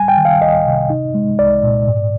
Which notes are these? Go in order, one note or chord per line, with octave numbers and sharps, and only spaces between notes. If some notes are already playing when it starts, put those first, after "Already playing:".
Already playing: G3 G#5
G5
D#3
F5
C2 D#5
C3
D#4
G#3
C2 D5
A#2
G#2